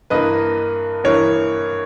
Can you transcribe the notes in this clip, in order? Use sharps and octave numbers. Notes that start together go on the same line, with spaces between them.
G2 E3 A#3 B4 D#5
G2 E3 A#3 A#4 C#5